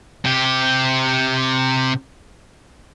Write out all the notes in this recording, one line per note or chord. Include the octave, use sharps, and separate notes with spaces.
C3 G4